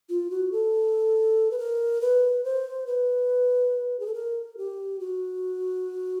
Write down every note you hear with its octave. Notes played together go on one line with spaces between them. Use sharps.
F4
F#4
A4
B4
A#4
B4
C5
B4
G#4
A4
A#4
G4
F#4